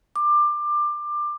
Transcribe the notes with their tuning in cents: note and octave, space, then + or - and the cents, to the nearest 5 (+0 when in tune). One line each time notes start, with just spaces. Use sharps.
D6 +20